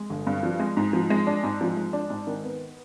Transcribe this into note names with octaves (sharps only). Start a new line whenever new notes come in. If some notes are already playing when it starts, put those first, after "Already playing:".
Already playing: G#3
G1
G2
F3
G#3
G#2
F3
G#3
D4
G#2
F3
G#3
D4
G#2
D#3
B3